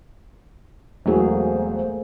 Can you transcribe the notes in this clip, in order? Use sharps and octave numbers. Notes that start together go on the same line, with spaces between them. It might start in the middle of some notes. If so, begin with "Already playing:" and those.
E1 F#3 A3 A#3 G#4 C5